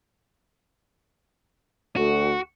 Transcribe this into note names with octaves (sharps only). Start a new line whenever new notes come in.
D2 F#4